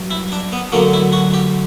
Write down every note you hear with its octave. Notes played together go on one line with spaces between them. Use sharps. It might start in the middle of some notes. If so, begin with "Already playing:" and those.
Already playing: G2 F#3
E4
D4
B3
D2 D3 F#3 A#3
E4
F#4
G4